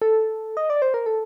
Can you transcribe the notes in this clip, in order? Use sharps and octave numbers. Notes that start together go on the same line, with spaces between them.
A4
D#5
D5
C5
A#4
A4